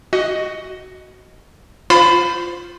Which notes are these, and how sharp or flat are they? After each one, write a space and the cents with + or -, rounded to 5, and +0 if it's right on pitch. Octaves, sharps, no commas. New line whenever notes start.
F#4 +10 D#5 +0
F4 +0 C5 -10 B5 +25